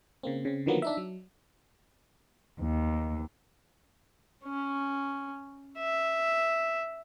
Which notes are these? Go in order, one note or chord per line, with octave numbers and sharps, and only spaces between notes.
C#3 A#3 C4
C#3 C4
D3 D#3 F3 F#3 A#3 B3
D4 D#4 E5
F#3
D#2
C#4
E5